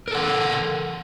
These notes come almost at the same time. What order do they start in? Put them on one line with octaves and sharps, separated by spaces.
A#4 A4 F#5